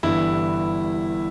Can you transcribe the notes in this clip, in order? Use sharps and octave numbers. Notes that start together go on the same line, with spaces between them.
G1 G2 E3 E4